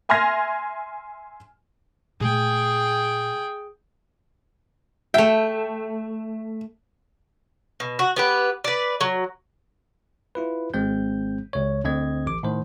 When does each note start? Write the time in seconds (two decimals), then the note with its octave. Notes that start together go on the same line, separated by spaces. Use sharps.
0.09 E5 G#5 C6 F6 G#6 A#6
2.20 A#2 A3 G#4 G5
5.14 A3 E5 G5
7.80 B2
7.99 F#4
8.16 B3 G4 B4
8.64 B4 D5
9.01 F#3
10.35 E4 F4 B4
10.74 G#1 G#3 C4 G6
11.53 C#2 C#5
11.84 D2 D3 C4 D#5 G#6
12.26 A1 D6
12.43 A2 D#3 C5